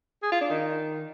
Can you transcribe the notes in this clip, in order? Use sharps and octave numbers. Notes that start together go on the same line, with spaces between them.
G#4
F4
D4
D#3